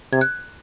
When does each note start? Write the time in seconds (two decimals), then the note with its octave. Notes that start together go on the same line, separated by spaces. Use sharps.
0.12 C3 G#6
0.21 F#6